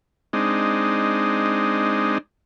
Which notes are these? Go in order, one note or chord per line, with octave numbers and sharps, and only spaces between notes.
G#3 C4 D4 D#4